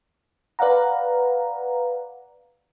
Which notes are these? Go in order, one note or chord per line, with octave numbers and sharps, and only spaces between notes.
B4 D5 F5 F#5 A#5